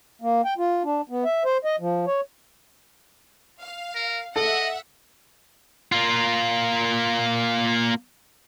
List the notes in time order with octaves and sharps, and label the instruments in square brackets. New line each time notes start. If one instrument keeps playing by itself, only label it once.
[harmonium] A#3
G5
F4
D4
B3
E5
C5
D#5
F3
C#5
[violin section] F5
[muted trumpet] A#4
[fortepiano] A4 [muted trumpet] D#5 [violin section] E5 F#5
[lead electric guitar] A#3 F4